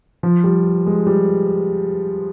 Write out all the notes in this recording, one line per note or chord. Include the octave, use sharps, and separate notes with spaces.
F3
G3
G#3
G3